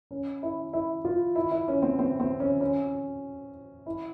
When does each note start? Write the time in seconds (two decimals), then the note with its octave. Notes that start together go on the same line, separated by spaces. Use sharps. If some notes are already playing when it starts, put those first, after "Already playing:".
0.11 C#4
0.43 E4
0.73 E4
1.05 F4
1.35 E4
1.51 E4
1.68 C#4
1.82 C4
1.99 C4
2.20 C4
2.40 C#4
2.61 C#4
3.86 E4